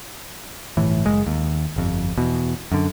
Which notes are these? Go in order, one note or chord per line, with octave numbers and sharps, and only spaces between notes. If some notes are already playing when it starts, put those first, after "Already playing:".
G1 A2 E3
F#1 G#3
D#2
G1 F2
E2 B2
F#2 D3